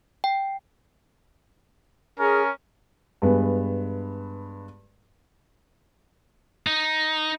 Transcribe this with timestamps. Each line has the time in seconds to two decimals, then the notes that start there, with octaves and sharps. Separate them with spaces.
0.24 G5
2.20 C#4 G#4 A#4
3.22 G2 G#3 B3
6.67 D#4